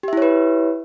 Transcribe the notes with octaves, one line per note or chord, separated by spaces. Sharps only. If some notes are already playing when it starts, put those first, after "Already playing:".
E4 G4 B4 C#5 E5